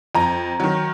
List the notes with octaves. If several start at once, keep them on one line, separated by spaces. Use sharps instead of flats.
F2 A#5
D#3 F#3